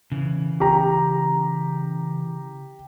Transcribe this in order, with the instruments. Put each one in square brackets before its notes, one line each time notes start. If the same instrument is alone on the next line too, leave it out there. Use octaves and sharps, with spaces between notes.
[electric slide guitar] C#3 E3
[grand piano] G4 A#5